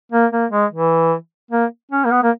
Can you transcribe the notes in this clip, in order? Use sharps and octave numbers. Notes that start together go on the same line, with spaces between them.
A#3
A#3
G#3
E3
A#3
C#4
A#3
B3
A#3